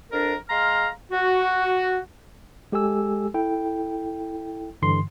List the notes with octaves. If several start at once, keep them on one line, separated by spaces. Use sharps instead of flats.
F2 D4 A#4
G#3 F5 A#5 C6 F6
F#4
G#3 G4 A4 G#5 E6
E4 A4 G5
G2 D3 E3 C6 C7